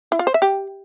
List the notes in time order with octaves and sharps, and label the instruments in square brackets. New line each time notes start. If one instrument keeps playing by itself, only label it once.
[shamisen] E4
F4
C5
E5
G4